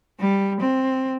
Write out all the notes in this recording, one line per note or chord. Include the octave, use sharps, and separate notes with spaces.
G3
C4